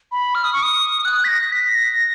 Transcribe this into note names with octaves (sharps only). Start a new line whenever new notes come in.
B5
F6
D#6
C#6
D#6
F#6
B6
A#6
B6
A#6